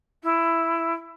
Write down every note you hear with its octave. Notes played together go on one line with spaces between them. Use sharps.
E4